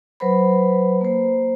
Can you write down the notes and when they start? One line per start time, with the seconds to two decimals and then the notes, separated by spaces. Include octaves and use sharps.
0.20 F#3 B4 C5 B5
1.01 A#3 C5